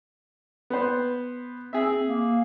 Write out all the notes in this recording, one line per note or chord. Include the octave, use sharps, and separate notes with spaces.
B3 B4 C5
C4 G#4 E5
A#3